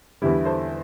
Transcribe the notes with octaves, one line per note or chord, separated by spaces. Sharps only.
E2 D3 G3 E4 G4
A4 C5